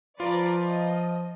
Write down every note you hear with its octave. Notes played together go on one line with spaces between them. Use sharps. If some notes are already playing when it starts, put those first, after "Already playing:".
F3 F4 B4 D5 A#5
D#5